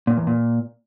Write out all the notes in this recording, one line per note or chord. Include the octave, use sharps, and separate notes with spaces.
A#2
E2
A#2